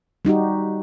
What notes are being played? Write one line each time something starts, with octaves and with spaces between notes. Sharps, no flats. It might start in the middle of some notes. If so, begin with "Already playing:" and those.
G3 D#4 F#4 G4